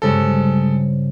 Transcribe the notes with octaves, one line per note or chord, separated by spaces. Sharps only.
G2 C#3 G#3 C4 A4